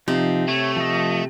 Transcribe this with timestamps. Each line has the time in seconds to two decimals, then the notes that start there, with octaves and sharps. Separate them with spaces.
0.08 C3 F3 D#4
0.48 A3 C#5
0.76 F3 D#5